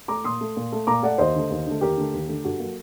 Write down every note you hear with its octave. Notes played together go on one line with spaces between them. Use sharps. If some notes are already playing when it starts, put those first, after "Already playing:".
A3 A#5 D6
A#2 C6 D#6
A3
A#2
A3
A#2 A#5 D6
A3 D5 F#5
D#2 C5 D#5
D3 A3
D#2
D3 A3
D#2 G4 A#4
D3 A3
D#2
D3 A3
G2 F#4 A4
F#3 A#3